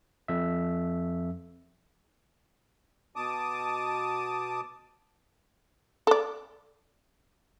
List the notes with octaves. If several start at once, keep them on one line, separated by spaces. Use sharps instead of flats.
F2 E5
B2 A5 D6 D#6
A4 D5